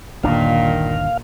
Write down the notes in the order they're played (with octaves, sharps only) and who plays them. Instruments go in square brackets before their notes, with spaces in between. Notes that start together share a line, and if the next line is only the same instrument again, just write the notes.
[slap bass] G1 D#2 D4 [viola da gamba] A#2 [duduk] D#3 [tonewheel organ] F5